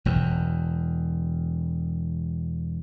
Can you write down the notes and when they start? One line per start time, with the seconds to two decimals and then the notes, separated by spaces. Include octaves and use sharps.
0.05 E1 E2